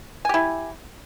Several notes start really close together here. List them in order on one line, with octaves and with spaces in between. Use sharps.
G#5 G4 E4